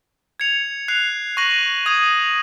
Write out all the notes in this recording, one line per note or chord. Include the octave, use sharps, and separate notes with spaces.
G#6 C#7 F7
F#6 C7 F7
C#6 F#6 A#6 D#7 F#7
D#6 G#6 D#7